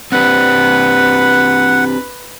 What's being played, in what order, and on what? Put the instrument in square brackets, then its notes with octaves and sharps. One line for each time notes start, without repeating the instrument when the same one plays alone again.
[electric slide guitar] C4 D4 G4 [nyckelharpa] B4 [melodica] F#5